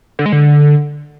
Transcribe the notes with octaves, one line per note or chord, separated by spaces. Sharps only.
D3
G#3
D3